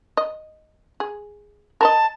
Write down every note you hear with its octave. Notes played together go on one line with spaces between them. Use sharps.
D#5
G#4
A#4 B4 D#5 A5